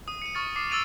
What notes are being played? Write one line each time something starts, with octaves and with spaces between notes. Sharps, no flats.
D#6 D#7
C#7 D#7
C#6 F6 A6
D6 C7
E6 F6 A6 D7 D#7 F7